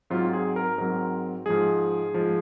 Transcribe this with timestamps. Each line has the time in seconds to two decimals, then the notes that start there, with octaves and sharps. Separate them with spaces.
0.10 G#2 F#3 C4 F4
0.33 G#4
0.56 A#4
0.78 G#2 F#3 C4 A#4
1.46 G#2 F3 G#3 G#4
2.14 G#2 F3 G#3